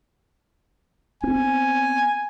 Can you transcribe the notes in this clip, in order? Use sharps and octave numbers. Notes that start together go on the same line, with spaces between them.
B3 C4 G#5